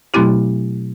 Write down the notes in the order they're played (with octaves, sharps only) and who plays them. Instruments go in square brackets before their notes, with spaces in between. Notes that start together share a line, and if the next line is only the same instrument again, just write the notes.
[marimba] B2 F#3 A3 C4 E4 G4